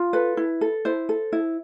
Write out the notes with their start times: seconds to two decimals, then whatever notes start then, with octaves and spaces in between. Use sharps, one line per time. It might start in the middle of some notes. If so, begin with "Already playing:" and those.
Already playing: F4
0.13 A4 B4
0.37 E4
0.61 A4
0.85 E4 C5
1.09 A4
1.32 E4